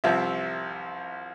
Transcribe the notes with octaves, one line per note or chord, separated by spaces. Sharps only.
C2 C3 F3 C4 E5